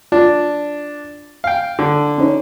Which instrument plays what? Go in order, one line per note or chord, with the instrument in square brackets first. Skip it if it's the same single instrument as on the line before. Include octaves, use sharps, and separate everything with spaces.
[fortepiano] D4 [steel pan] F4
[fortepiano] F5 G5
D3
[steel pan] C#4 D#4 C5